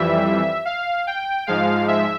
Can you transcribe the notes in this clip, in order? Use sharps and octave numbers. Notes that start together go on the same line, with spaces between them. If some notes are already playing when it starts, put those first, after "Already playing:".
Already playing: F2 E3 G3 E5
F5
G5
G#2 F3 G#3 F5
E5